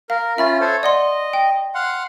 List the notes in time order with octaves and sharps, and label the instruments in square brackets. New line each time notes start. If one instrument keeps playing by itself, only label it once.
[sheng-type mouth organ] A#4 [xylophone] F5
[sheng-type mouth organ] C#4 F4 [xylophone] E5 B5 A6
[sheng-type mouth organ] A4 C5 C#5
[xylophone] D5 F#5 C6 [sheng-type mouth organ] D#5
[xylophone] G5
[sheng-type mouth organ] F5 F#5 C6